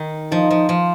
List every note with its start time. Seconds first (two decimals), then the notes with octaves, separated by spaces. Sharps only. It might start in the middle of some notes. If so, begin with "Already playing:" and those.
Already playing: D#3
0.32 F3 D#4
0.50 F3
0.69 F3